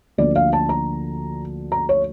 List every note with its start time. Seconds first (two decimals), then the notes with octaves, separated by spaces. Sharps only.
0.18 D2 D3 F3 A#3 D4 D5
0.36 F5
0.53 A5
0.69 A#5
1.72 A#5
1.89 C#5